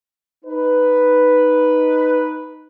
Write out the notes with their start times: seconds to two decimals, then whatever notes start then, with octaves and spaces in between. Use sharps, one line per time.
0.45 D#4 B4